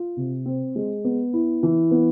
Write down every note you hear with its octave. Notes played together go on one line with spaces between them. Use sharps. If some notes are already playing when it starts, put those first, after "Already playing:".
Already playing: F4
C3
C4
G#3
B3
E4
E3
B3